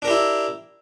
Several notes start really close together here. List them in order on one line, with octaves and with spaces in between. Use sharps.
D4 A#4 G4 E4